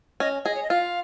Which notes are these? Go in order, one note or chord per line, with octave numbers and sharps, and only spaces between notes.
C#4 D#5
G#4 D#5
C#5
D#5
F4 F5